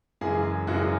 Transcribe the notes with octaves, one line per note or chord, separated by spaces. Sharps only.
F#2 C#3 E3 G#3 G#4
F#2 C#3 E3 G#3 F#4